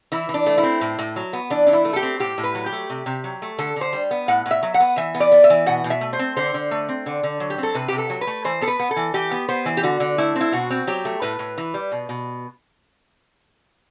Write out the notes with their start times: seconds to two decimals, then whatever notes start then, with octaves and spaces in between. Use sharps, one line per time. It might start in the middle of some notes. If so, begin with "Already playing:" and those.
0.12 E3 E4
0.29 E3
0.34 D4
0.46 A3
0.58 E4
0.63 C4
0.81 A2
0.99 A2
1.16 F#3
1.33 B3
1.50 E3 D4
1.67 E3 D4
1.73 E4
1.85 A3
1.93 A4
1.96 G4
2.03 C4
2.20 A2 G4
2.38 A2
2.44 B4
2.55 F#3
2.66 G4
2.72 A3
2.90 C3
3.06 C3
3.24 F#3
3.42 A3
3.58 D3 A4
3.76 D3
3.81 C5
3.93 G3
4.11 B3
4.28 A2 F#5
4.46 A2
4.51 E5
4.63 F#3
4.74 F#5
4.80 B3
4.97 E3 E5
5.15 B3
5.20 D5
5.32 B3
5.44 E5
5.50 E3
5.66 B2 F#5
5.84 B2
5.90 E5
6.01 A3
6.13 C5
6.19 C4
6.36 D3 C5
6.54 D3
6.71 A3
6.89 C4
7.06 D3
7.23 D3
7.40 F#3
7.50 G4
7.58 C4
7.63 A4
7.75 C3 B4
7.88 C3 G4
7.98 A4
8.10 F#3
8.21 B4
8.27 A3
8.45 E3 C5
8.61 B3 A4
8.68 B4
8.80 B3
8.91 A4
8.96 E3
9.14 E3 G4
9.31 B3
9.49 B3 C5
9.66 E3
9.77 G4
9.83 D3 F#4
10.00 D3
10.18 A3 E4
10.36 C4
10.41 E4
10.52 B2 F#4
10.70 C4
10.87 F#3 G4
11.05 A3
11.22 A2 B4
11.39 A2
11.58 E3
11.74 G3
11.92 B2
12.09 B2